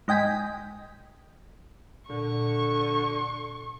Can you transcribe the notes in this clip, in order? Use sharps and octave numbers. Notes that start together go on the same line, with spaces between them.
G#2 D#5 G5 G#5 B6
A#2 D3 C#6